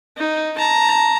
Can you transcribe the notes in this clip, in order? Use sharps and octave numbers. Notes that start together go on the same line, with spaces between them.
D#4
A5 A#5